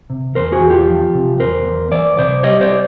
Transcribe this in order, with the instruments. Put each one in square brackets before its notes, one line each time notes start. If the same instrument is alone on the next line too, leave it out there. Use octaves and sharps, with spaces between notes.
[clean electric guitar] C3
E2 A#4 C5
F#4 G#4
E2
F4 G4
F3
C3
E2 A#4 C5
E2
E3 C5 D5
C3 C5 D5
G3 C#5 D#5
C5 D5